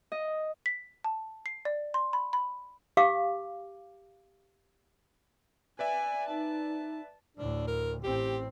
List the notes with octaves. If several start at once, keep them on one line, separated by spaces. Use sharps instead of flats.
D#5
B6
A5
C7
D5
C6
B5
B5
G4 F5 D6
B4 D5 E5 G#5
D#4 A5
D2 A2 D4
A#4
A1 C4 G4